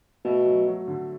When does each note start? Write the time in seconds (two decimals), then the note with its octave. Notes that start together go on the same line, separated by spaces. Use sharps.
0.24 B2 A3
0.46 F#3
0.67 F#3
0.88 D3